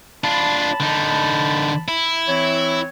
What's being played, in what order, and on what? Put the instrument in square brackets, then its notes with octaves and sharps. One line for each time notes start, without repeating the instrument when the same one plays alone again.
[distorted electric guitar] D4 F4 [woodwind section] A5 B5
[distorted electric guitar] D3 D#4
E4
[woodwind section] E3 C4 C#5